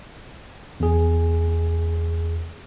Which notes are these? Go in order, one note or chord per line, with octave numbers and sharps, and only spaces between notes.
E2 G#4